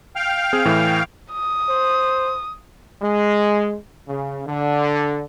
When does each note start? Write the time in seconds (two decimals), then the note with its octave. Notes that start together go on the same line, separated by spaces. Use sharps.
0.16 F5 G5 F6
0.53 C4 G#4
0.65 A2 E3
1.32 D#6
1.70 C5
3.01 G#3
4.08 C#3
4.46 D3